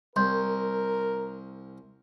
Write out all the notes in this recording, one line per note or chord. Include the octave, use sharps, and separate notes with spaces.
C2 A#4 C6 G6